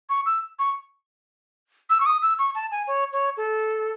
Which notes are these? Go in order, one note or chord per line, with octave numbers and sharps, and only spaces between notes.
C#6
E6
C#6
E6
C#6
D#6
E6
C#6
A5
G#5
C#5
C#5
A4